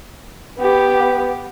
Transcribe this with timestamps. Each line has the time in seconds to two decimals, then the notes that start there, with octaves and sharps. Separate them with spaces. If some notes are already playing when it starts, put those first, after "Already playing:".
0.59 B3 G4